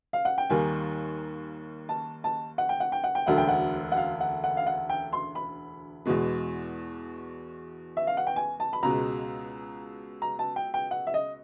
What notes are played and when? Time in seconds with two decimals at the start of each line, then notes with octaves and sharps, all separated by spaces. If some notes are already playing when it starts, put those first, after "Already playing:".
0.13 F5
0.25 F#5
0.38 G5
0.50 D#2 D#3 G3 A#3 G#5
1.89 A5
2.24 A5
2.58 F#5
2.69 G5
2.80 F#5
2.92 G5
3.04 F#5
3.15 G5
3.26 E1 D2 D3 F#3 F#5
3.38 G5
3.48 F#5
3.92 F#5
3.97 F5
4.20 F#5
4.44 F#5
4.57 F5
4.67 F#5
4.89 G5
5.13 C6
5.35 B5
6.06 E2 B2 G#3
7.97 E5
8.07 F5
8.17 F#5
8.27 G5
8.36 G#5
8.60 A5
8.73 B5
8.83 C#2 B2 G#3 A#5
10.22 A#5
10.39 A5
10.56 G5
10.74 G5
10.91 F#5
11.07 E5
11.14 D#5